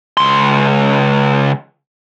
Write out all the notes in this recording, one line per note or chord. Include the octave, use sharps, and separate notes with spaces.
C#2 C6